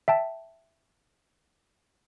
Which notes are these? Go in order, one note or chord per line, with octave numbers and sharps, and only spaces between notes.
E5 G5 A5